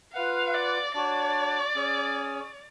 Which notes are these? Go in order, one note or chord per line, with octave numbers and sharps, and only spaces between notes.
F4 B4 F5 F#5
D5
D4 F#4 C#5 D5
C#4 G#4 C#5